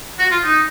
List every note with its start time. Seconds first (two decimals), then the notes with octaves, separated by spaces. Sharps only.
0.19 F#4
0.31 F4
0.44 D#4